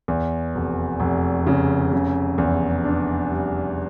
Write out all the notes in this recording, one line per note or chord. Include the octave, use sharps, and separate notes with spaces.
E2
F1
F1
C#3
C#3
E2
D4
G3